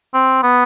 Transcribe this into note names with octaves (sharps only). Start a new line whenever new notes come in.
C4
B3